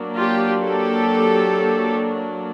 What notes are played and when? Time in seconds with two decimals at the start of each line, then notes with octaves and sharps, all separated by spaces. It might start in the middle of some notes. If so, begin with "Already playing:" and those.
Already playing: F#3 A#3 D4
0.17 F4 G4
0.63 G4 A4